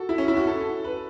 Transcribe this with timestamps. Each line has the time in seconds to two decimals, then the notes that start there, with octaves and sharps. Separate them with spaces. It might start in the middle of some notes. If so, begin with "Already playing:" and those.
Already playing: F#4 A4
0.09 E4
0.18 C#4
0.28 E4
0.37 F#4
0.47 A4
0.84 B4